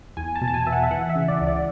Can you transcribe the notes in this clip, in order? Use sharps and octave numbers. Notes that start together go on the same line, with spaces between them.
E2 G#5
A5
B2
A5
G#5
B2 E5
F#5
E5
E3 F#5
E5
C#3
D5
C#2
D5